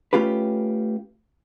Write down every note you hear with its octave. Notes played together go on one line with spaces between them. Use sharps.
A3 C#4 F4 G4 B4